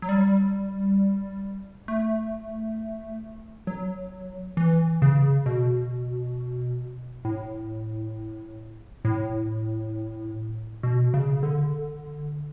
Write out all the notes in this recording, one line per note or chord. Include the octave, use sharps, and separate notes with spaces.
F#3
G3
A3
F#3
E3
C#3
B2
A2
A2
B2
C#3
D3